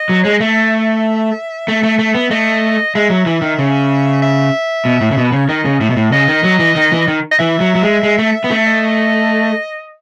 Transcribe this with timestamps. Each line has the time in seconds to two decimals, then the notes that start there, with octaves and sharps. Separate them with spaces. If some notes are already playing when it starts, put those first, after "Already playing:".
Already playing: D#5
0.09 F#3
0.23 G#3 C#5
0.32 D#5
0.40 A3 E5
1.68 A3
1.83 A3
1.99 A3
2.15 B3
2.31 A3 D#5
2.95 G#3 E5
3.10 F#3
3.26 E3
3.42 D#3
3.59 C#3
4.22 E5
4.85 B2
5.01 A2
5.11 C#3
5.17 B2
5.24 B4
5.32 C#3 C#5
5.49 D#3 D#5
5.65 C#3
5.80 A2 E5
5.90 B2
5.97 A2
6.12 C#3 D#5
6.28 D#3
6.44 F#3
6.59 E3
6.76 D#3
6.92 E3
7.08 D#3
7.31 D#5
7.39 E3 E5
7.60 F#3
7.75 F#3
7.82 G#3
8.03 G#3
8.19 A3
8.44 B3
8.51 A3
8.66 D#5